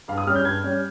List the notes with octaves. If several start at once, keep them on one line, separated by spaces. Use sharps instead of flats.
G2 F5
D#6
G3 C#4 F6
G6
G2 G#6
G3 C#4